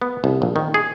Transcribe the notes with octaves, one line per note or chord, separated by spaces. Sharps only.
B3
C2
A#1
D#3
G#4